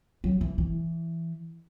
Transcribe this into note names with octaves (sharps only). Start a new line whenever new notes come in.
F#3
E3
E3